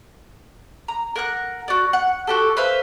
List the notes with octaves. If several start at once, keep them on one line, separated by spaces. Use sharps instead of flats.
A#5
A#4 F#5 F#6
F#4 D5
F#5
F#4 G4 A4
B4 C5 E5 F5